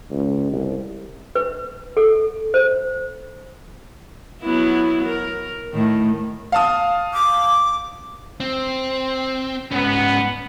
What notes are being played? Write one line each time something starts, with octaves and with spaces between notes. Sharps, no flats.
C#2
C2
B4
A4
C5
F#3 B3 E4
A#4
A2 D#3
F5 A5 D#6
D6
C4
G#2 B3 C#4